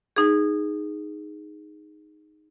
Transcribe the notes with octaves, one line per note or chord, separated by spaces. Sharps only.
D#4 G#4